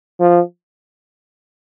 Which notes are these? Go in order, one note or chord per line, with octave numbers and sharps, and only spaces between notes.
F3